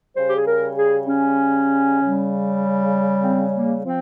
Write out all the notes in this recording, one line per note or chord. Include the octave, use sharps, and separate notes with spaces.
C#3 G3 C5
G4
G#4
A#4
G#4
C#4
C#3 G3
C4
A#3
F3 C4